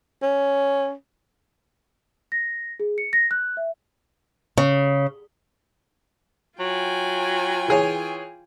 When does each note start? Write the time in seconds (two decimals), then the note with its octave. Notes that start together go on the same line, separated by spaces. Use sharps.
0.23 C#4
2.32 A#6
2.80 G#4
2.98 C#7
3.13 A#6
3.31 F#6
3.57 E5
4.58 C#3
6.59 F#3 F4 G5 G#5
7.68 E3 G#4 C#5